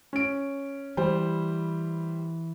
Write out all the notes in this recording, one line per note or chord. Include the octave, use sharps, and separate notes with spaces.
C#4 D7
E3 G3 C5